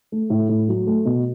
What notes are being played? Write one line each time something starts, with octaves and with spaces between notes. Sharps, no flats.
A3
A2
A2
F#3
A3
B2